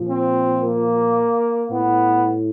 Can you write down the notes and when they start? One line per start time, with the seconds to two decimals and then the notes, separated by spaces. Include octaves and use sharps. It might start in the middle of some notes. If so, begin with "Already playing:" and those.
Already playing: A#2 F3
0.09 C4
0.63 A#3
1.71 A2 B3